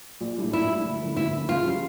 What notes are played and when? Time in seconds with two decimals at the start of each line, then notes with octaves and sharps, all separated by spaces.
0.21 A#1
0.38 A2 G3 D4
0.53 A#1 E4
0.69 A2 G3 D4
0.85 D2
1.02 D3 F3 A#3 C#4
1.16 D2 E4
1.33 D3 F3 A#3 C#4
1.49 C#3 F4
1.65 F3 C#4 G4